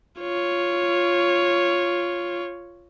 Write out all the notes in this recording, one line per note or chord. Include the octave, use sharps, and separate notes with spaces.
F4 C#5